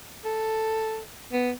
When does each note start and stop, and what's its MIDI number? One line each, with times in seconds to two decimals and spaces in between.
0.25 1.00 69
1.32 1.50 59